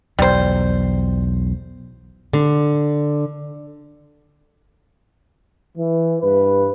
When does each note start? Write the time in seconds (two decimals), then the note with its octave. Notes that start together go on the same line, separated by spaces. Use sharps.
0.19 B1 E2 G3 C5
2.33 D3
5.77 E3
6.21 G2 B4